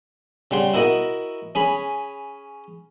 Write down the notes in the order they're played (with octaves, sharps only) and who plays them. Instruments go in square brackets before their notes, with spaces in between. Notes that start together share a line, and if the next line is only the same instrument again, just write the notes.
[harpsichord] C#3 G3 F#5 C6
E4 F#4 A#4 D#5 F#5
C#4 G#4 B5